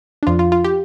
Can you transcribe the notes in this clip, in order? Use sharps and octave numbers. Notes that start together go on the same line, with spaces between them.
D4
F2 F3 F4
F4
F4
G4